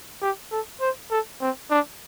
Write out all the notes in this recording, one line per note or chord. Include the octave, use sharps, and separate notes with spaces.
G4
A4
C5
A4
C4
D4